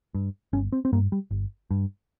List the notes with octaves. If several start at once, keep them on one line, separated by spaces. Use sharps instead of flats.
G2
G1 C#4
C4
C4
G2 A#3
G3
G1
G2